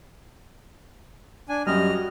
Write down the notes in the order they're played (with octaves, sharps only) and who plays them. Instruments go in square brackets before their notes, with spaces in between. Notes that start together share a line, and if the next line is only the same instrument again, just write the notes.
[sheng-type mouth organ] D4 G#5
[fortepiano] F#2 G3 [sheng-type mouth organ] D#5 F6
[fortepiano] F#4